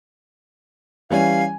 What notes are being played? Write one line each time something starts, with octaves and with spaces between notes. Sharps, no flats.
E3 G3 C#4 F5 G#5